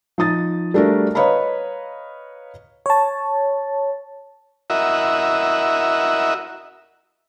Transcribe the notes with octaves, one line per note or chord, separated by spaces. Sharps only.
F3 D#4 D#6 A6
G3 A3 D4 F#4 A#4
B4 C#5 D#5 F5 A#5 B5
C#5 A5
E4 F#4 A#4 D#5 E5